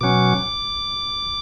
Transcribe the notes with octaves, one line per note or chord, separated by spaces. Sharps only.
B2 F#3 C#4 D6